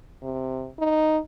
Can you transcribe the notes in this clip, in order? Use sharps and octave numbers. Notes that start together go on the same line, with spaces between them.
C3
D#4